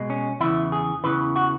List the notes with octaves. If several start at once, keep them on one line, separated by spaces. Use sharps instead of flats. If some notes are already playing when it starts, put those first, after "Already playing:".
Already playing: B2 G#3
C#4
E2 C#3 E3 E4
G#4
E2 C#3 E3 B4
F#4